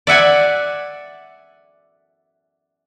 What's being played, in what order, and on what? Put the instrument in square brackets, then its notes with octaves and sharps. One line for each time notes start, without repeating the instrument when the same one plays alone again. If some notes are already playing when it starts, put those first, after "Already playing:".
[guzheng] D5 E5 F#5 G#5